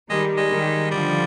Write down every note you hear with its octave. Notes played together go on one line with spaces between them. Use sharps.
D#3 G3 G#3
G#3
D#3 G3
D3 F3 G3